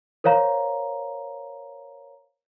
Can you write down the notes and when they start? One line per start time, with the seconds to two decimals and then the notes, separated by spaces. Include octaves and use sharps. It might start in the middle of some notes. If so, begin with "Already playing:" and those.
0.24 A#4 C5 C#5 F5 A#5